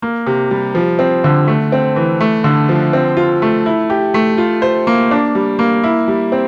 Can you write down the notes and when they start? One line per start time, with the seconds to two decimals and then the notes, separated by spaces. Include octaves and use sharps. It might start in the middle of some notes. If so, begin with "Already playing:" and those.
0.02 A#3
0.26 C3
0.51 G3
0.75 F3
0.99 C4
1.24 D3
1.47 A3
1.72 C4
1.96 E3
2.20 A3
2.44 D3
2.69 F3
2.93 C4
3.17 F4
3.42 A3
3.66 E4
3.90 G4
4.14 A3
4.38 F4
4.62 C5
4.87 A#3
5.11 D4
5.35 G3
5.59 A#3
5.83 E4
6.08 G3
6.32 C4